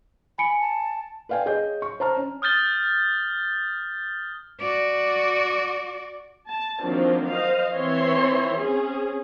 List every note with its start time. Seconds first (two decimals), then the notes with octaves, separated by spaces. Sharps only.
0.38 G#5 B5 C#7 D7
0.60 A5
1.29 B4 D5 F5 G5 G#5
1.46 G#4 C#5 D#5 G6
1.82 C#6
2.00 C5 A5 A#5 F6
2.17 C#4
2.42 D#6 F6 G6 A6 G7
4.60 F#4 D5
6.46 A5
6.81 D#3 F3 F#3 A#3 C4 D4
7.31 C5 D#5 F5
7.74 E3 C4 C#5 E5 C6
8.59 C4 C#4 G#4